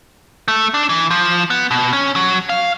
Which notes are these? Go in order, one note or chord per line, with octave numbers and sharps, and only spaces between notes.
A3
D4
E3
F3
B3
B2
C#4
F#3
F5